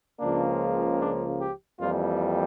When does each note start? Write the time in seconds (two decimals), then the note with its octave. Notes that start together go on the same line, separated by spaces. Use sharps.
0.20 C#2 C#3 F3 A#3 D4
1.01 D4
1.41 G4
1.80 F2 E3 G3 A#3 F4